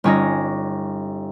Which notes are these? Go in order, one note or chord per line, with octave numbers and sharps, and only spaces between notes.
G1 C#4 D#4 A#6